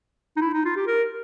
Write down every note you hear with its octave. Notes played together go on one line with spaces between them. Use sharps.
D#4
E4
D#4
F4
G4
A#4